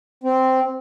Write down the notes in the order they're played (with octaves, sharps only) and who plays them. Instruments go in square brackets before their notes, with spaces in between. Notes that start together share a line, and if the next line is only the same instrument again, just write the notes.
[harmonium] C4